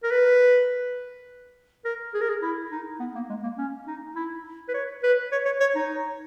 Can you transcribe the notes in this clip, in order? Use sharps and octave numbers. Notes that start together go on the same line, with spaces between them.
A#4
B4
A#4
G#4
A#4
G#4
E4
D#4
B3
A#3
G#3
A#3
C#4
D#4
E4
B4
C#5
B4
C#5
C#5
C#5
D#4